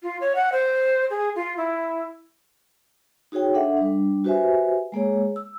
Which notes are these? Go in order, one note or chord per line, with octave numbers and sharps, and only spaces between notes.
F4
C#5
F#5
C5
G#4
F4
E4
D#4 F#4 G#4 C#5 G5
D4 A4 E5 F#5
G3 D4
F#4 G4 B4 C5 E5 G#5
G#3 A#3 G#4 C#5
E6